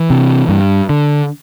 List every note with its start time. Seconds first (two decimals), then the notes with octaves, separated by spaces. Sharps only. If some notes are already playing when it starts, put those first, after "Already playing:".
Already playing: E3
0.10 C3
0.49 G2
0.89 D3